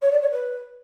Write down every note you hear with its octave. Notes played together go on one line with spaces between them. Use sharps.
C#5
D5
C#5
B4